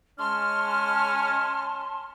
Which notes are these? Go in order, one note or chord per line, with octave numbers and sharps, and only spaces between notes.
G#3 C#4 A5 C6 F6